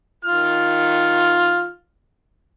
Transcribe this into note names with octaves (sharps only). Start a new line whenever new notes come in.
D#3 F4 F6